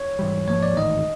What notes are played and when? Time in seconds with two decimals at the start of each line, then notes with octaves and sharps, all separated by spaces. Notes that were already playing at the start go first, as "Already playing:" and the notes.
Already playing: C#5
0.19 G#2 E3 G3
0.48 G#2 F3 A#3 C#5
0.63 D5
0.77 A1 G#2 D#3 D#5